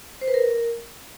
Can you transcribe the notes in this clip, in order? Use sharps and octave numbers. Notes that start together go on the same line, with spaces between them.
C5
B4
A#4